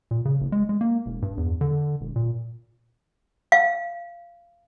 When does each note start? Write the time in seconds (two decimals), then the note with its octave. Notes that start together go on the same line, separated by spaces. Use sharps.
0.11 A#2
0.25 C#3
0.41 F#1
0.52 G#3
0.69 G#3
0.81 A#3
1.06 E1
1.22 G2
1.38 E2
1.61 D3
2.01 E1
2.16 A#2
3.52 F5